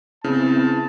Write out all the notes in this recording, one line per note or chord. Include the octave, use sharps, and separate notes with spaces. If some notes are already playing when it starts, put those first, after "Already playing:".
C#3 B3 C4 E4 A5